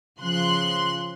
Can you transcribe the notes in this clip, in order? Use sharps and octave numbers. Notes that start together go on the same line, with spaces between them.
C#3 F3 C6 F#6